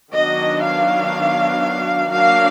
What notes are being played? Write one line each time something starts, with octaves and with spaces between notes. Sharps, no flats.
D#3 F#3 B3 D4 D#5
F5
F#3 A#3 D4 F5